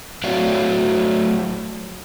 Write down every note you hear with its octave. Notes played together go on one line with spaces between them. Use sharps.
F#3 A3 F#4 C#5 D5 F5